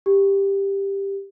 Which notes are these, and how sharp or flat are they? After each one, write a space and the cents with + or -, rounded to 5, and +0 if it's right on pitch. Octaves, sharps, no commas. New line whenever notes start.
G4 +10